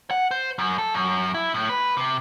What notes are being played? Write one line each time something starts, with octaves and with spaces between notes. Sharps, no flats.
F#5
C5
F#2
A4
F#2
E4
A2
B4
C3